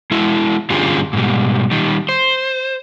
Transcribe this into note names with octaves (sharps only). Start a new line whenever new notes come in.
G#3 E4 F#4
G2 D3 C#4 F4 G4 G#4
G#2 B2 G3
D#3 G3
C5